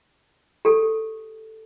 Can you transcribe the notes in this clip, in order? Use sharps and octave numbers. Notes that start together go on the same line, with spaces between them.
G4 A4